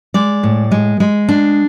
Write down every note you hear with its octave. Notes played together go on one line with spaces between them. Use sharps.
G#3 D5
A2
G#3
G#3
D4